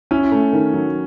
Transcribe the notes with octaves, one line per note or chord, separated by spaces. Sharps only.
C#4 E4
A3
D#3
F#3